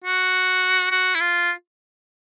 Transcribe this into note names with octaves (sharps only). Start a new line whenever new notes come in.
F#4
F#4
E4
F4